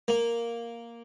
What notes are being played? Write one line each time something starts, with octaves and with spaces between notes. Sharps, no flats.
A#3